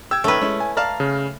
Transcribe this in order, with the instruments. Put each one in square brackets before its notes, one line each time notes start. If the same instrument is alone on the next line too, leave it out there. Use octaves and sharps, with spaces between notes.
[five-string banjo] G4 [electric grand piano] E6 G#6
[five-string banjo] D#3 A#3 C#4 [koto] A3 B4
[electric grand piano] G#3 [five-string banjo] C#4 E4
[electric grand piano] G#5
[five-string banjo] D5 F5 A5 [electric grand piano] A#5 F6
[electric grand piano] C#3